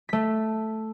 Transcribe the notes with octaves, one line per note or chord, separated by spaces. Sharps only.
A3 B6